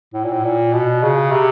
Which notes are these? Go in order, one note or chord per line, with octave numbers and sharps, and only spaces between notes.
A2
A#2
A2
A#2
B2
C#3
C3